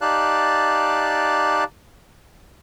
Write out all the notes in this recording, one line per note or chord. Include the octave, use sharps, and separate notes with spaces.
D#4 G4 D5 F5 A5 F#6